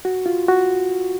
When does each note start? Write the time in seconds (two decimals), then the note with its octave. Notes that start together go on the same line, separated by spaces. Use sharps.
0.05 F#4
0.26 F4
0.48 F#4